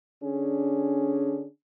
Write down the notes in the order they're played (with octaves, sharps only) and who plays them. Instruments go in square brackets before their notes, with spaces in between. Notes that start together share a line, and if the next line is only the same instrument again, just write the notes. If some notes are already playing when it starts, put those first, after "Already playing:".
[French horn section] D3 C#4 D4 G#4